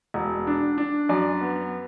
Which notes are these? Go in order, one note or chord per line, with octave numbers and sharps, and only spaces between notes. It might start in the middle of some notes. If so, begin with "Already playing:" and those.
E1
D4
D4
F#2 D5
B3